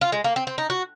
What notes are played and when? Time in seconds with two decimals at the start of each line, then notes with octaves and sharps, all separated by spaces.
0.01 F4
0.12 G#3
0.24 A#3
0.36 C4
0.47 C4
0.58 D#4
0.70 F#4